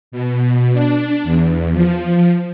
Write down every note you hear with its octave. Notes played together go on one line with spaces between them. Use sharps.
B2
D4
E2
F3